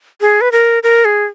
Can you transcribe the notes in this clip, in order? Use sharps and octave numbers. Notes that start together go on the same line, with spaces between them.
G#4
B4
A#4
A#4
G#4